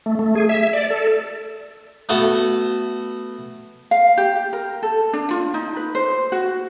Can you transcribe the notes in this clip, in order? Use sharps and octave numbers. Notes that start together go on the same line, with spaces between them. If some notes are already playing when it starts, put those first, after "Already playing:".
A3
A3
G#4
E5
D5
A4
A3 B3 F#4 A4
F5
G4
A#4
A4
D4
F4
D#4
B4
C5
F#4